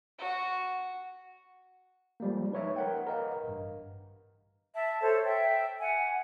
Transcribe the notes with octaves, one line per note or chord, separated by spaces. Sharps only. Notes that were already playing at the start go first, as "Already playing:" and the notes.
F#4
F3 G3 G#3 A#3
D#4 B4 C#5 E5
A#4 F#5 G5
A#4 B4 D#5 F5
A1 G2
E5 A5
A4 C5 C#5
E5 G5
F#5 G#5